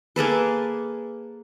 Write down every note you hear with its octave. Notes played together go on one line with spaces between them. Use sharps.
A#3 G#4 A4 B4